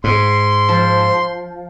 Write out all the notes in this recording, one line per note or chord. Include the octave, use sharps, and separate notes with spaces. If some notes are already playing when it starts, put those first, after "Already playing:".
G#2 C6
F3